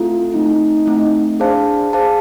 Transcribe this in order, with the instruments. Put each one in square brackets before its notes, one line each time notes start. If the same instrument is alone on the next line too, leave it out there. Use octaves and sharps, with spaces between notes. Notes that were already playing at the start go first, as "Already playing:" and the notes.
Already playing: [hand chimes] A3 C4 E4 A4 [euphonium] F4
[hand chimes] A3 C4 E4 [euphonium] D#4
[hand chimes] A3 C4 E4
[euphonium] D4 [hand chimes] G#4 C5 F5 A5
[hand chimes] G#4 C5 F5 A5